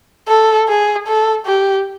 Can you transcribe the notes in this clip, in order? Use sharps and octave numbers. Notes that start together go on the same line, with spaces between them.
A4
G#4
A4
G4